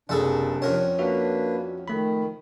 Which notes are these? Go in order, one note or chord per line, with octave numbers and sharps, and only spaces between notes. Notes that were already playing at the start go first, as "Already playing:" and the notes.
F#1 C3 D4 G#4 A4 F#5
F2 C#4 A#4 F#5
A#3 D4 F#4 B4 E5
D#3 A3 B5